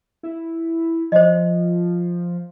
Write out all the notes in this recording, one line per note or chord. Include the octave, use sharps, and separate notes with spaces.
E4
F3 C5 D#5